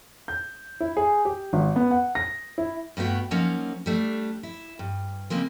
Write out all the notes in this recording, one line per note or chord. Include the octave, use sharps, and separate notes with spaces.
G6
E4
G#4
G4
G#1
B3
F#5
A#6
E4
G2 A3 B3 F#4 G5
F3 F#3 A#3 C#4 D#4
G3 A3 D4
E4
G2
C#3 G#3 A#3 C4